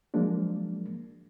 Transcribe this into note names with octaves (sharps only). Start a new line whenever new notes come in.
F3 F#3 G#3 A#3 D4